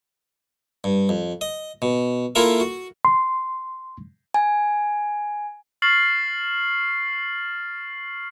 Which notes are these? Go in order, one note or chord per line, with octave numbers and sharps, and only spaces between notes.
G2
F2
D#5
B2
A#3 E4 F4 A4 A#4 E5
F#4
C6
G#5
C#6 F6 A6 C7 F#7